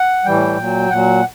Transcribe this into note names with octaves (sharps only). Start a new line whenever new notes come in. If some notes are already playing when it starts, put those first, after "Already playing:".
Already playing: F#5
A2 E3 G3 G5
A#2 F#3
A#2 F#3 F#5